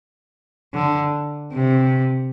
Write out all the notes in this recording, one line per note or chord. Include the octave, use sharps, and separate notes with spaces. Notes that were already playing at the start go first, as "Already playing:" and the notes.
D3
C3